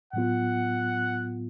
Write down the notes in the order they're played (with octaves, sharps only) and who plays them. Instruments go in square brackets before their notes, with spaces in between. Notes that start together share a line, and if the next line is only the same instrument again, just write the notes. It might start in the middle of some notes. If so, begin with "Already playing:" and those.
[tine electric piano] A2 F#3 B3 F4 [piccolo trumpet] F#5